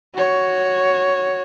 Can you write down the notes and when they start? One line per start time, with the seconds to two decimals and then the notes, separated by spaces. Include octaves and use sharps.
0.15 F#4 C#5